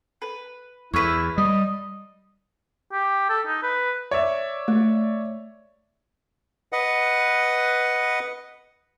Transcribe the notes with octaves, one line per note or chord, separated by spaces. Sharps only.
B4
E2 E4 B4 C#5
G3 D#5
G4
A4
D#4
B4
C#5 D5 E5
A3
B4 D#5 F#5